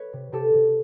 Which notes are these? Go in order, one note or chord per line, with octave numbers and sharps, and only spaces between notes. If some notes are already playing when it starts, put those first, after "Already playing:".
Already playing: B4 C#5
C3
C3 G4 A4
C3